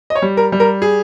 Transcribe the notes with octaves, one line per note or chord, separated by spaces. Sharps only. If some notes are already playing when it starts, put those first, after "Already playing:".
D#5
C#5
G3
A#4
G3
A#4
G#4